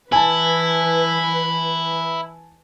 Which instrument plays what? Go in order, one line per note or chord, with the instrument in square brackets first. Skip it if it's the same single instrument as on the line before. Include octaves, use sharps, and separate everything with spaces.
[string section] E3 B4 [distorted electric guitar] E4 [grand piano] G#5 A5